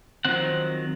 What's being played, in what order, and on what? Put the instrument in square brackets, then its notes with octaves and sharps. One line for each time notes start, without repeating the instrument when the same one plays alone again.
[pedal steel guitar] D#3 F3 F#3 C4 F#5